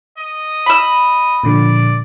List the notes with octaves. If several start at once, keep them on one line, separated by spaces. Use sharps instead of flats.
D#5
B5 E6
A#2 D3 F3 D5